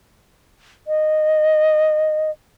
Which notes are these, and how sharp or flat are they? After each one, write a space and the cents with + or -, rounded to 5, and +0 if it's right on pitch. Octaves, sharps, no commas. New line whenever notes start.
D#5 -10